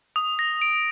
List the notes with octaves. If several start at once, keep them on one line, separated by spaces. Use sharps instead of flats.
D#6
A#6
D7